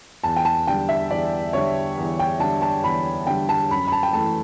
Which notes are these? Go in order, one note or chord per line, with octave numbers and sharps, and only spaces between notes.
E2 A5
G5
A5
D3 G3 G5
E5
E2 D5
D3 G3 C#5
E2
G5
D3 G3 A5
A5
E2 B5
D3 G3 G5
A5
F#2 B5
B5
A5
G5
E3 A3 A5